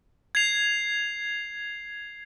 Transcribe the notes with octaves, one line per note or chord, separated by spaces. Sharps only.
G#6 C7 F7